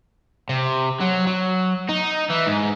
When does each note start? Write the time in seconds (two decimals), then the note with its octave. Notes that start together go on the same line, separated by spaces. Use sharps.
0.49 C3
1.00 F#3
1.27 F#3
1.89 D#4
2.30 E3
2.47 G#2